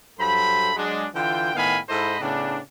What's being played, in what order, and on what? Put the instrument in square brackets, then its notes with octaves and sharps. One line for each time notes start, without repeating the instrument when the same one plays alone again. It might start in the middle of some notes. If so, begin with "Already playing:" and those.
[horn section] G2 F#3 A4 C5 B5
F#3 G#3 D4
D3 E3 F4 G5
A2 D#3 B3 F5 G#5 B5
G#2 E4 A4 C5 D#5 B5
A2 C#3 B3 D4